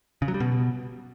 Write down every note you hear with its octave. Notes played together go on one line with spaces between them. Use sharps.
C#3
F#3
G3
B2